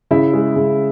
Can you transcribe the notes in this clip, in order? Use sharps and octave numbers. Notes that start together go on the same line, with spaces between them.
C#3 E4 E5
G#3
C#3